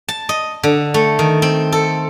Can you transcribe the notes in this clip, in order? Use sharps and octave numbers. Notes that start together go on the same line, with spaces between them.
A5
D#5
D3
A3
D#3
C4
A4